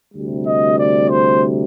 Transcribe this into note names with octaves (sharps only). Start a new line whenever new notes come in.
D2 C3 G3
D#5
D5
C5